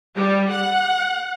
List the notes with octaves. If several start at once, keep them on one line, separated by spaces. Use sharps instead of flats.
G3
F#5